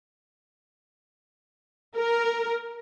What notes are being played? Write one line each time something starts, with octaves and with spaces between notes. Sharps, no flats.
A#4